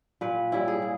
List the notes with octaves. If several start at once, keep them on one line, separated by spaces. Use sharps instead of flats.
A#2 B4
G3 C#4 E4
G#4
A#2